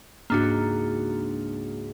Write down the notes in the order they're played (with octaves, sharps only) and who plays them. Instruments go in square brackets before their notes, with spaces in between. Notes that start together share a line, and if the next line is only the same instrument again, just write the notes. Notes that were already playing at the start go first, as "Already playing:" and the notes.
[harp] C#2 G#2 A#5 [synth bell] A#3 D4 F#4